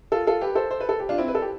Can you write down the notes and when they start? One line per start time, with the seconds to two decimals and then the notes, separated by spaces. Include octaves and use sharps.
0.12 F4 A4
0.27 F4 A4
0.41 G4 B4
0.55 A4 C5
0.70 C5
0.80 B4
0.89 A4
1.00 G4
1.09 D4 F4
1.18 C4 E4
1.28 B4
1.35 A4
1.42 G4